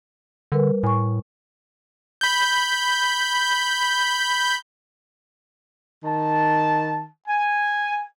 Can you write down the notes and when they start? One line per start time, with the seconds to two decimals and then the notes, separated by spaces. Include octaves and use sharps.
0.52 D3 G3 A#4 B4
0.83 A2 G#5 C#6
2.21 B5 G6
6.04 D#3 A5
7.28 G#5